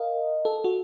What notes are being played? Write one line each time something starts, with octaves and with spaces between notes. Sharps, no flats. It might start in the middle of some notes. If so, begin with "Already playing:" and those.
Already playing: A#4 D#5 F5
A4
F#4